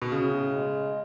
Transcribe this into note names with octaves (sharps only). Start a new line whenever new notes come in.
B2
A2 C#3
G#3